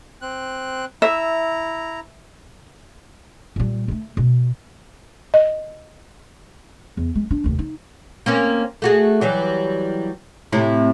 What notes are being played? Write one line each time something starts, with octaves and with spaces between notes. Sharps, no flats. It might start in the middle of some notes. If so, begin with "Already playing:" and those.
C4 F#6
E4 E5 A#5
A#2 G3
G3 A3
B2
D#5
E2
G#3
D4
F1 D#2
D#4
A#3 C4 C#4
A3 F#4 G#4
E3 F#3 G3
A2 C3 E4